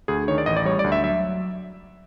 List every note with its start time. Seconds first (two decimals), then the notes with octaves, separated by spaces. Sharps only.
0.08 D2 G#4
0.28 D#3 C#5
0.38 D5
0.46 A1 D#5
0.57 D5
0.65 G3 C#5
0.79 D5
0.84 D2
0.92 E5
1.03 F#3 E5